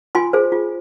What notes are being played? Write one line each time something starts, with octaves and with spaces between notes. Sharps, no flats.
F4 G#5 C6
G#4 C5
F4